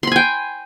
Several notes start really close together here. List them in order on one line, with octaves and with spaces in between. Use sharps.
C6 B5 G#5 G5